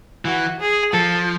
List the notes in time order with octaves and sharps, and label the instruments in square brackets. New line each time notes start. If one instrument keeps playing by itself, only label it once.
[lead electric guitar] E3 [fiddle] F#4
[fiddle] G#4
[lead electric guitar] F3 [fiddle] A4